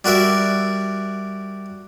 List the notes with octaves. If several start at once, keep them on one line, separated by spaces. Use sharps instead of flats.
G3 F#4 A#4 E5